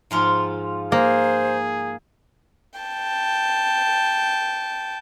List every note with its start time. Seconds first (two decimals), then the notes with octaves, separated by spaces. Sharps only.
0.11 G#2 F3 F4
0.92 A#3 G#4 C5
2.80 G5 A5